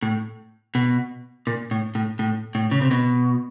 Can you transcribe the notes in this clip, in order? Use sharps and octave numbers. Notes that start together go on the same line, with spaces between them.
A2
B2
A#2
A2
A2
A2
A2
C#3
C3
B2